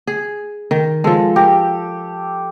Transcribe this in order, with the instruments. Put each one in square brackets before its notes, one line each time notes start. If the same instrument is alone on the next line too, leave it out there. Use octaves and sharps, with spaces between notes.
[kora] G#4
D#3
[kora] F3 G#3 [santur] A4
[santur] G4 [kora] A#4